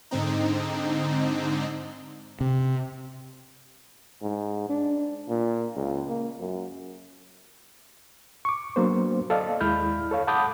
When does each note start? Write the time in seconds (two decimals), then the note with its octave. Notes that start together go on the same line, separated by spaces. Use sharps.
0.11 G#2 D3 C4 D#4
2.41 C3
4.22 G#2
4.69 D4
5.28 A#2
5.76 C#2
6.08 A#3
6.39 F#2
8.45 C#6 D6
8.76 F#3 A#3 B3 D4 C5
9.30 A4 D5 D#5 F5
9.60 D#2 G#3 E4 B5 F6 G6
10.11 A4 C#5 F5
10.27 F#5 A5 B5 D6 D#6 G6